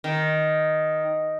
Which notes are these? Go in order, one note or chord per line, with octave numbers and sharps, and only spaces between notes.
D#3